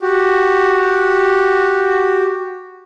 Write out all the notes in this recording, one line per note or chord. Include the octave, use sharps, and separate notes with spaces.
F#4 G4